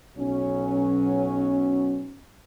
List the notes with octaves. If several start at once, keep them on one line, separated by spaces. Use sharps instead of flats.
B1 F#3 C#4